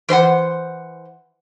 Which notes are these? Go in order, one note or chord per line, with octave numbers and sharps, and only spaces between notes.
E3 C5 D#5 F#5